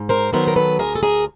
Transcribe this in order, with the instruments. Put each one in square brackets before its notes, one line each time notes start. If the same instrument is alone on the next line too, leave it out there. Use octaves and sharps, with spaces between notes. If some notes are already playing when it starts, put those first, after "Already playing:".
Already playing: [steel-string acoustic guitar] G#2
A#4 C5
D#3 F#3 B3 A#4 C5
A#4
A4 B4
D2 G#4 A#4
A4
G#4 A#4